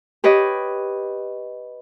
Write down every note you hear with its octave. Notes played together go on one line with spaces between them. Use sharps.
G4 B4 C#5 D#5